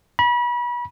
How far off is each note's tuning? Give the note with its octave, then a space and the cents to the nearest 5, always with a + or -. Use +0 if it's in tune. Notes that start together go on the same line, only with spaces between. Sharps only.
B5 -35